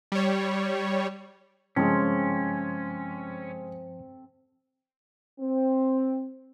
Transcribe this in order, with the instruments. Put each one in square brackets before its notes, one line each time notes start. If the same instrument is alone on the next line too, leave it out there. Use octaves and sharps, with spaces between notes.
[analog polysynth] G3 C#5
[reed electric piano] G2 F3 A5 [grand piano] C#3 G#3 [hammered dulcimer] C4 A4 [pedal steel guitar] C#4
[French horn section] C4